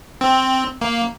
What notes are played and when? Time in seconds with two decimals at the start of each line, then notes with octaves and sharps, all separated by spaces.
0.21 C4
0.81 A#3